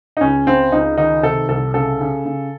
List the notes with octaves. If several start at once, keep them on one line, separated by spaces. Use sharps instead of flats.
D#4
C#2 C#4
C#3 C4
C#2 D#4
D#3 D#4
C3 A4
C2 A4
C#3 A4
C#3
C#3